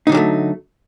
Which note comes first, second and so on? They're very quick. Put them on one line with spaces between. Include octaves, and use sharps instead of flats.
D#4 D3 F#3 G3 A3